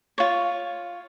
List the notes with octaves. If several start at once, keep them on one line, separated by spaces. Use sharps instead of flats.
F4 C#5